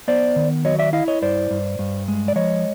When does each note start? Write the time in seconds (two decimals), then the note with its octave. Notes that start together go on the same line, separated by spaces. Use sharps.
0.08 B3 C5 D5
0.36 D#3
0.65 F#3 C#5 D#5
0.79 D5 E5
0.93 E4 D#5 F5
1.08 C#5 D#5
1.22 G2 C5 D5
1.51 G2
1.79 G2
2.08 G#3
2.28 D5
2.36 F3 C#5 D#5